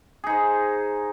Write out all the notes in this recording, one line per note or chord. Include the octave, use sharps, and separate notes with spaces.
D#4 G#4 C5